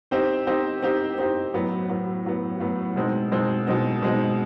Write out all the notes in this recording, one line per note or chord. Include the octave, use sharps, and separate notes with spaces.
C4 D#4 G4 C5
C4 D#4 G4 C5
C4 D#4 G4 C5
C4 D#4 G4 C5
A2 F#3 B3
A2 F#3 B3
A2 F#3 B3
A2 F#3 B3
B2 G#3 C4 D#4
B2 G#3 C4 D#4
B2 G#3 C4 D#4
B2 G#3 C4 D#4